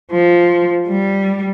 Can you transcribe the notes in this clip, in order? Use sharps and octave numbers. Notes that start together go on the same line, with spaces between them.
F3
G3